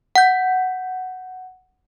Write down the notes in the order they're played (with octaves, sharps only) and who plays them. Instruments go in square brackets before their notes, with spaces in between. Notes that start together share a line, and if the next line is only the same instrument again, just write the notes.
[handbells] F#5 G6